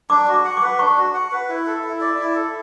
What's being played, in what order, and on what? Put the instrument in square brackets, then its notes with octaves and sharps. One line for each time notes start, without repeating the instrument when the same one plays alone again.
[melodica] D4 [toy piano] D6
[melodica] F#4
[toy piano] D6
[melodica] F#5
[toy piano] D6
[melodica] B4
[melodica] D4 [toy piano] C#6
[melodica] F#4
F#5
B4
E4
A4
E4
D5
E4
A4